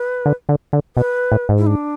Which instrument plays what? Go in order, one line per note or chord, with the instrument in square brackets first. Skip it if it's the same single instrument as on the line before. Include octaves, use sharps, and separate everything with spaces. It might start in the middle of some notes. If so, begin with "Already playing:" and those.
Already playing: [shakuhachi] B4
[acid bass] D3
D3
D3
[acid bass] B2 [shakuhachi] B4
[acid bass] A2
G#2
[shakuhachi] E4
D4